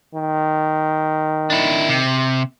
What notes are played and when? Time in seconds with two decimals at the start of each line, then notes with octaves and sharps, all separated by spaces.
0.15 D#3
1.50 D4 E4
1.89 C3